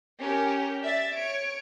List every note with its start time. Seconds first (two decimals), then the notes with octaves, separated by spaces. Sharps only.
0.21 C#4 G4 A#4
0.82 D5 E5 A6
1.14 C#5 D7